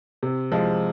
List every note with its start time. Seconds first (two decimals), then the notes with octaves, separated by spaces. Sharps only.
0.23 C3
0.52 F3 G#3